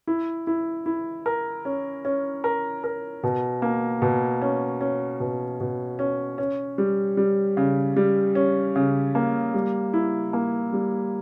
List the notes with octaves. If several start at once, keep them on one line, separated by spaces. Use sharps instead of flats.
E4
E4
E4
A#4
C#4
C#4
A#4
A#4
B2
A#3
B2
C#4
C#4
B2
B2
C#4
C#4
G3
G3
C#3
G3
C#4
C#3
A#3
G3
E4
A#3
G3